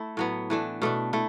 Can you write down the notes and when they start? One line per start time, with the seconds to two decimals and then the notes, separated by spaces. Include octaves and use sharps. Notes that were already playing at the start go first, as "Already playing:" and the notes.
Already playing: A3 E4
0.17 A2 F#3 B3
0.50 E3 A3 D4
0.82 B2 A3 D4
1.13 A3 E4